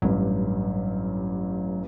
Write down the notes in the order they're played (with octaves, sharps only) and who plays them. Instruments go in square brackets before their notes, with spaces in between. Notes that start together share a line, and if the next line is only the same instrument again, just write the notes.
[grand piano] A1 G2 [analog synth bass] F#3